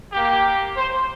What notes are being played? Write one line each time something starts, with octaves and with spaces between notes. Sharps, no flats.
A#3 G4
C5